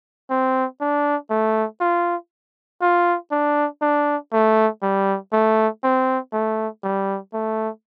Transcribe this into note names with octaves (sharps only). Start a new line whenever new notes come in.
C4
D4
A3
F4
F4
D4
D4
A3
G3
A3
C4
A3
G3
A3